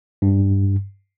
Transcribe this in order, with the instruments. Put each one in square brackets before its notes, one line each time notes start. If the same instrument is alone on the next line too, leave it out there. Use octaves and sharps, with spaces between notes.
[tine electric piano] G2